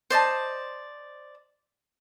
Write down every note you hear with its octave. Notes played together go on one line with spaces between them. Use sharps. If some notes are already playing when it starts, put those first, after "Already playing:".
C5 D5 D#5 A5